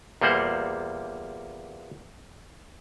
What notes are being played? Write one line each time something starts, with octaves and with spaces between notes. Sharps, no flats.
E2 A#2 G3 A#3 C5 F#5